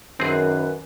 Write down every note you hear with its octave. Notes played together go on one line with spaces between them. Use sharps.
F#2 D#3 C4 G#4 B4